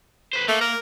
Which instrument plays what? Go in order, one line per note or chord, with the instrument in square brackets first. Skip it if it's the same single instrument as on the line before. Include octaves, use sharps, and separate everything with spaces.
[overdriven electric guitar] B4 C5
[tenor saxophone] A3 [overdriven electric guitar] A#3
[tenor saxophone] A#4